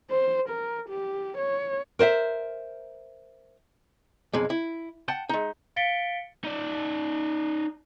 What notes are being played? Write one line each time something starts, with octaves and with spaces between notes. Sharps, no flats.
C5
A#4
G4
C#5
A#4 C5 D#5 E5
B1 F2 G#3
E4
F#5 G5 A5
G#3 D#4
F5 A6 B6 C#7 D7 G7
D#4 D5